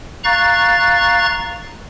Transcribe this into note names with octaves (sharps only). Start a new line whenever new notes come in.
F5 A#5 C#6 F#6 A6